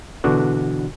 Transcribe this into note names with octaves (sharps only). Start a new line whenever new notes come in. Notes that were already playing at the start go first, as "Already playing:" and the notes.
B2 D3 E3 D4 F#4